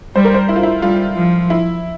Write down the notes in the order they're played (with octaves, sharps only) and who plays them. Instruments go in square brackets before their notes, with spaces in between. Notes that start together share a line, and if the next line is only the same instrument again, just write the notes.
[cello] G3 [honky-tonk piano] C5
[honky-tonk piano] A#4
C5
E4
F4
E4
[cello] G3 [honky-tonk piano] F4
[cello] F3
[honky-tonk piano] E4